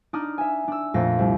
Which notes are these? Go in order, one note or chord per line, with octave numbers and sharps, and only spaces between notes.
D4 D#4 D#6 F6
E5 G#5
D4 E6
F2 A#2 A3 A#6
C2